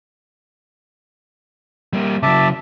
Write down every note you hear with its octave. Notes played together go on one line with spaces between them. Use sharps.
G3 A#3
C#3 F#3 E5 A5 D6